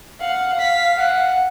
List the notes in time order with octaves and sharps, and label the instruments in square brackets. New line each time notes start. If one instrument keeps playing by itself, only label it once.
[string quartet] F5 F#5
[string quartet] F5 [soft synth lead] B6
[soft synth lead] F#5